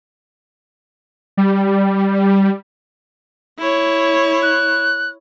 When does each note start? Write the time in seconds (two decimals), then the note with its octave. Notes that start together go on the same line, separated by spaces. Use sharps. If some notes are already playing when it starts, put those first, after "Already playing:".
1.37 G3
3.59 E4 C#5
4.43 F#6